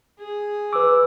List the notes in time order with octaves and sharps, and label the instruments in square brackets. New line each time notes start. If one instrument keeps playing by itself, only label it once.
[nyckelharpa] G#4
[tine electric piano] B4 D6 [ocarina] E6